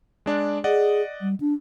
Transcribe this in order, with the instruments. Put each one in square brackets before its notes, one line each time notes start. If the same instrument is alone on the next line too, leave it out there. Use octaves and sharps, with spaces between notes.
[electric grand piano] G#3 D4 D5
[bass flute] G#4 [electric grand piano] D5 D#5 F#5
[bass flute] G3
D4